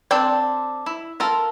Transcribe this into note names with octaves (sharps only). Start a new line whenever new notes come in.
C4 D4 A4 D5 G5
E4
F4 A4 A#4